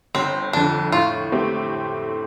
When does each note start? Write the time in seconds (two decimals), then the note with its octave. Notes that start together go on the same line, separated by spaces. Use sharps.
0.15 G1 C4
0.53 F2 D3 D4
0.92 A2 F4
1.32 A3 C4 G4